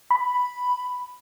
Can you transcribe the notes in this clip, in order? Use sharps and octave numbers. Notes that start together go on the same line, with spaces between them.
B5